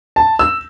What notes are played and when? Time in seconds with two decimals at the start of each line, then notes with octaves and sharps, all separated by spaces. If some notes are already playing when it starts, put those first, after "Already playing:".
0.16 A5
0.39 E6